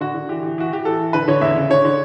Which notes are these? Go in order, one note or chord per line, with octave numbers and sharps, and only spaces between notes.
D3 F#4
D3
E3 G4
E3
E3 F#4
E3 G4
E3 A4
E3
D3 B4
D3 C#5
E2 E5
C#3
D3 C#5
D3